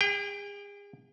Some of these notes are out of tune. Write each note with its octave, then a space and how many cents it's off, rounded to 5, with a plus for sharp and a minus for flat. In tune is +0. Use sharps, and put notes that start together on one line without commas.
G#4 -40 G5 +5